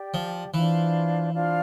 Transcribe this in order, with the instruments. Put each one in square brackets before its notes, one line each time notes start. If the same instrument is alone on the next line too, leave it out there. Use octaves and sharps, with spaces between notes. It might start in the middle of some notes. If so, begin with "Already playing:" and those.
Already playing: [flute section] G4 D5 G5
[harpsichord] F3
[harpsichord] E3 [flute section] D4 F4 C5 F5
[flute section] D4 F4 C5 F5